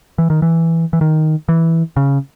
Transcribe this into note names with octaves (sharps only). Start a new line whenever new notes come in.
E3
D#3
E3
E3
D#3
E3
C#3